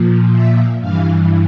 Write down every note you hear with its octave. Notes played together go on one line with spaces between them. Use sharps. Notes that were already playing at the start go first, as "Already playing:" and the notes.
Already playing: A#2 F3
E5
G2 E3 F5